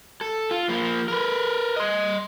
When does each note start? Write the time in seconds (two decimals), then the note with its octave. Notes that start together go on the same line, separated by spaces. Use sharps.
0.21 A4
0.51 F4
0.69 F3 A#3
1.08 A#4 B4
1.76 D#5 C6